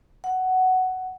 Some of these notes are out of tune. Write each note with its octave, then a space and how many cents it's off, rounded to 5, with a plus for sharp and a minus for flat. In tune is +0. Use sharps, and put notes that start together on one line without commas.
F#5 +10